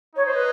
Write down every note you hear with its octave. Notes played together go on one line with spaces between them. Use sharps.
D#4 C#5
C5
B4